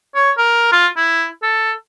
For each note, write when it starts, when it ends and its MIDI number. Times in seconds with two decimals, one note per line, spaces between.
0.15 0.31 73
0.38 0.72 70
0.72 0.87 65
0.97 1.27 64
1.43 1.72 69